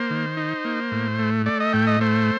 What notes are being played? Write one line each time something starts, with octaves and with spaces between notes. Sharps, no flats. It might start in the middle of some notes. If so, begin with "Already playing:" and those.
Already playing: A#3 C5
D#3
D#4
A#3
A2
A3
A3 D5
D#5
A2 G5
D#5
A3 C5